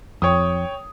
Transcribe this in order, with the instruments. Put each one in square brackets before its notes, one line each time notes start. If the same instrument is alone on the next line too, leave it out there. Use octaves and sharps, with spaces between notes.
[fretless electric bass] F2 [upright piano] C#5 G5 D#6